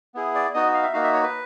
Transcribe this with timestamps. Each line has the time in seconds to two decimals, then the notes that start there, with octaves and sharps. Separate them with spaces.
0.15 B3 E4 G#4
0.35 D5
0.54 B3 D#4 F#4 D#5
0.74 F5
0.83 E5
0.93 A#3 D#4 F#4 F5
1.03 E5
1.13 C#5
1.23 B4